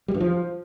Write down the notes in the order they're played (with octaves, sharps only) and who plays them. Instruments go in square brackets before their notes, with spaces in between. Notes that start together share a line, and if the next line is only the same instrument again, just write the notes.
[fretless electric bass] G3
G2
F3